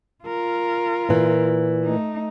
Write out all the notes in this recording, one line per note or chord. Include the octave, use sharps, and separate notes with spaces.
F4 A#4
A#2 E3
A3 D#4